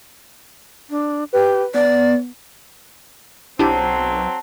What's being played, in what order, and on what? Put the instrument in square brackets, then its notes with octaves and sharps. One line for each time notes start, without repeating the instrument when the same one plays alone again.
[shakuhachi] D4
[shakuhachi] G4 [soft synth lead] B4
[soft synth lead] B3 [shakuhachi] D5
[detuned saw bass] B1 [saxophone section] F#3 C4 [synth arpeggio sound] D4 E4 G4 [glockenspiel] A5